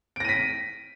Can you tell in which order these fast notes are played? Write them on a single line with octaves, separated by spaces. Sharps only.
D7 A#6 D#7 B6